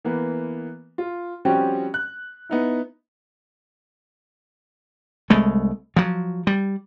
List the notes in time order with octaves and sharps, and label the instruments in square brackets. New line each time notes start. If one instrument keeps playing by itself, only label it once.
[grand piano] E3 A#3 B3
F4
F3 G3 C4 C#4 F#4 G4
F#6
B3 D#4 E4
[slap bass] C2 G#3 A3
F3 F#3
G3